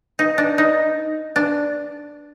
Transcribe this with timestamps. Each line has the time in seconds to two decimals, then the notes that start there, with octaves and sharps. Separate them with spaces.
0.19 D#4
0.38 D4
0.58 D#4
1.36 D4